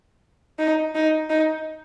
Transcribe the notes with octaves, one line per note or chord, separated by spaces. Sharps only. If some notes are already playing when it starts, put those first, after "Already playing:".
D#4
D#4
D#4